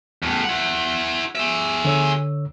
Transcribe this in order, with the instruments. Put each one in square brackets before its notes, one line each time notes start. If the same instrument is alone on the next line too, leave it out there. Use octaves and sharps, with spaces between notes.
[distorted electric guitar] E2 A2
E4 F#5
G#4 E5
[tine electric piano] D3 C#5 E6